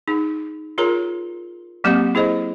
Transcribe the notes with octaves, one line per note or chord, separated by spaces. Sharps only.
D#4 G#4
F4 G#4 A#4 C#5 A#5
F#3 A#3 C4 G4 D5 F#5
E4 G#4 C5 D#5